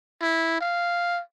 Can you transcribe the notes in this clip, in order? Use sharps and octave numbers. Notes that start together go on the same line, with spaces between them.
E4
F5